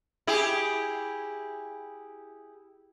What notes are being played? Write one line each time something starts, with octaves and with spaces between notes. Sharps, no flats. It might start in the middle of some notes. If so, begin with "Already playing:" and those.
E4 G4 G#4